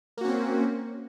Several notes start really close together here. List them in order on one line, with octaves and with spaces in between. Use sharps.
A#3 F#4 C#4 C4